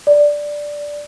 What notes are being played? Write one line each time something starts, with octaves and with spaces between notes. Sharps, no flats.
D5